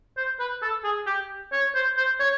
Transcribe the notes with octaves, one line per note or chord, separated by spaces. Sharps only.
C5
B4
A4
G#4
G4
C#5
C5
C5
C#5